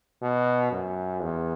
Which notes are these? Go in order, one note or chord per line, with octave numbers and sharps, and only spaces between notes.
B2
F#2
E2